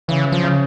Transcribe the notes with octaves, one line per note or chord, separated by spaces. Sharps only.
C#3 E3
F3
C#3